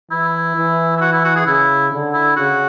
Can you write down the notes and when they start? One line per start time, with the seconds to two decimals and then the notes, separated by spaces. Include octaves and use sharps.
0.11 E3 E4
0.56 E3
0.97 E4
1.01 F#4
1.13 E4
1.25 F#4
1.36 G#4
1.46 C#3 E4
1.92 D3
2.14 E4
2.36 C#3 F#4